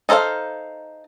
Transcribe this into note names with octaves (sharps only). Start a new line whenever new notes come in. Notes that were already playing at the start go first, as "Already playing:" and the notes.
D#4 A4 C5 D5 F5